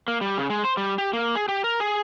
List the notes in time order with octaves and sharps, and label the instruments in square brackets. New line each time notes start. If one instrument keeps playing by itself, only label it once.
[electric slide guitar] A#3
G3
C#3
G#3
C5
G3
G4
A#3
G#4
G4
A#4
G#4